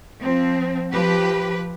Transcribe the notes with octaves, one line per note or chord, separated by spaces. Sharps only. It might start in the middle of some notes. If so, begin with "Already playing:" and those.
F3 C4
F3 G4 B4